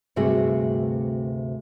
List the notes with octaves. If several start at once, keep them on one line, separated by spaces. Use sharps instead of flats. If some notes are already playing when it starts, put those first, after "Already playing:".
D2 G2 C3 A3 F#4 G#4